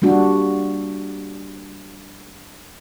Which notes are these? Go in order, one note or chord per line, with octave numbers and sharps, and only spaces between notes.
G3 A#3 D4 F#4